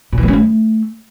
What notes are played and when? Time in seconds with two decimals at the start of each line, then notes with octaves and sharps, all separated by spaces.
0.13 A#2
0.18 E3
0.23 A#3
0.28 C#4
0.33 A3